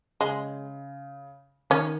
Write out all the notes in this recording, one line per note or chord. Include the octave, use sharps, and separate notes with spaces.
C#3 G#3
D#3 C#4